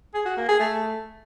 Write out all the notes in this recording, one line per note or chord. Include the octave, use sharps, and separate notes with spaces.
G#4
F#4
A#3
G#4
A3